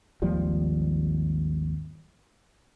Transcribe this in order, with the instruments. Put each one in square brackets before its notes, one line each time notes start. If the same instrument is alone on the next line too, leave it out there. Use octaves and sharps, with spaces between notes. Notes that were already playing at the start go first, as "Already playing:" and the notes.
[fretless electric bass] G#1 D#2 F3 G3